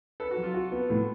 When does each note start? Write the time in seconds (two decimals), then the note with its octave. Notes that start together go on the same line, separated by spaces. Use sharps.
0.20 A4 B4
0.31 F#4
0.37 F#3
0.43 F4
0.54 F#4
0.72 B3
0.90 A2